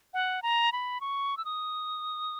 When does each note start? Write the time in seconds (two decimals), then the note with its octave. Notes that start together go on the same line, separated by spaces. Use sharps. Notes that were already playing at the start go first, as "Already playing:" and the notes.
0.14 F#5
0.43 A#5
0.72 B5
1.01 C#6
1.37 E6
1.45 D#6